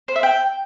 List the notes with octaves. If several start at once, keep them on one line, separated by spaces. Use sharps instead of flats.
C5
E5
G5